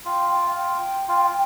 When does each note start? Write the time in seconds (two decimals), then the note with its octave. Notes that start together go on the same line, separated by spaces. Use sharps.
0.05 F4 G5
0.45 F5
0.56 G5
1.08 F4